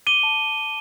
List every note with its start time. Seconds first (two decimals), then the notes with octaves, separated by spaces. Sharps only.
0.07 D6 D#7 G7
0.23 A5